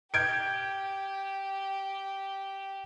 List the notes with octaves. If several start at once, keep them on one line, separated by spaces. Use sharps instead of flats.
G4 G6 G#6 D7